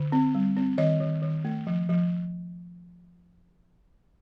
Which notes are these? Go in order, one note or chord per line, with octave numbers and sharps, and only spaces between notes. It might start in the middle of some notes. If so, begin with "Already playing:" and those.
Already playing: D3
C4
G3
C4
D#3 D#5
D#3
D#3
A3
F3
F3